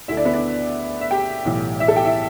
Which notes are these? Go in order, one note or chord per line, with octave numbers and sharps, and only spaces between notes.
D2 D3 E4 E5
D4 D5
B3 B4
D4 D5
E5
G4 G5
B1 A2 E3
E4 E5
A4
G4 G5
E4 E5